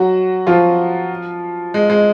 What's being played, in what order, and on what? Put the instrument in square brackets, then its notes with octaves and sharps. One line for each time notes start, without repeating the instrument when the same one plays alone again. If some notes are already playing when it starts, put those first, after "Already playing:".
Already playing: [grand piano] F#3 F#4
F3 F4
G#3
G#3